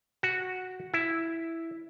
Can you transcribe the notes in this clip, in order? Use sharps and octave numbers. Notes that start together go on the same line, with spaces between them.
F#4
E4